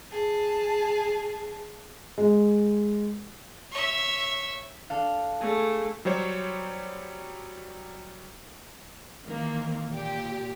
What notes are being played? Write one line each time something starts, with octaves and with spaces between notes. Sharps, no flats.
G#4 A5
G#3
C#5 E5
D4 A4 F5
A3 G#4 G#6
F#3 G3 C5 C#5
D#3 E3 A#3 C4
A#2 G4